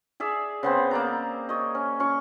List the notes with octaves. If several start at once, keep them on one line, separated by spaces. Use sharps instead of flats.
G#4 D5 E5
C#3 B3 C4
A#3 D5 A#5
C#5 D#5
C#4
C#4 C#6